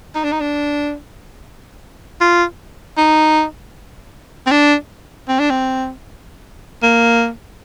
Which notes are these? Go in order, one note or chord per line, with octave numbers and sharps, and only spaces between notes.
D#4
D4
D#4
D4
F4
D#4
C4
D4
C4
D4
C4
A#3